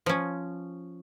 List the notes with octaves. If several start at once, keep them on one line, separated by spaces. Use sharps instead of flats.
F3 C#4